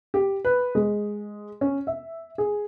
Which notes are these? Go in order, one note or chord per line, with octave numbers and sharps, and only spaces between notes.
G4
B4
G#3
C#4
E5
G#4